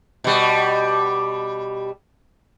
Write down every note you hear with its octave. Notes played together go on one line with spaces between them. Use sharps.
B2 G3